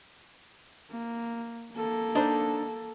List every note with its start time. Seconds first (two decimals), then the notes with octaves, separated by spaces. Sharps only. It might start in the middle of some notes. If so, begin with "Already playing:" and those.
0.91 A#3
1.73 A#3 A4
2.15 D4 D#4 C5